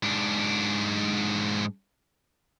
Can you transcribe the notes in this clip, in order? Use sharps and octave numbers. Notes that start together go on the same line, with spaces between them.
G#2 D4